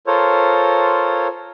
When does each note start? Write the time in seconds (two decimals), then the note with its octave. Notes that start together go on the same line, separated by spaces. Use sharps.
0.07 F4 A4 A#4 C5 C#5